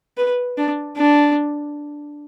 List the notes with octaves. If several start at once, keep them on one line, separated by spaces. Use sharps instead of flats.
B4
D4
D4